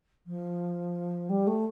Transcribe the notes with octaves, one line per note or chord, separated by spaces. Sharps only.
F3
G3
A3